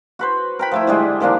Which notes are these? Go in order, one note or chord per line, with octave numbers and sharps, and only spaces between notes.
F#4 B4 C5
A#4 G5 B5
F3 A3 E4
D3 G3 G#3
D#3 F3 A#3 D4